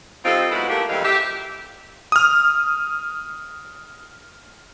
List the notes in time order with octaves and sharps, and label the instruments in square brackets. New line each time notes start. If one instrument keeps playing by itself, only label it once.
[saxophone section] G3 C4 D#4 F4 A4 C5
F#3 G#3 B3 E4
A3 A#3 G4
F2 E3 G3 G#3 C4 F5
G4 E5
[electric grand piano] D#6 F6